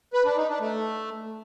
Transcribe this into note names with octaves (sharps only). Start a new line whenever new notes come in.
B4
D4
D#4
D4
A3